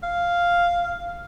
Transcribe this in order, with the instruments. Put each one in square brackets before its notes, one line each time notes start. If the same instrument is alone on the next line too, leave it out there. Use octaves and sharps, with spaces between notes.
[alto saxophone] F5